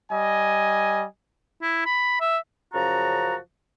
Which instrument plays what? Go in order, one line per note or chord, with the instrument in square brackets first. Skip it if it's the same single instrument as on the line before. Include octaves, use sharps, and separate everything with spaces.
[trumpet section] G3 D#5 G#5
[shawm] E4
B5
E5
[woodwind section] F#2 C#3 F3 F#4 A5 A#5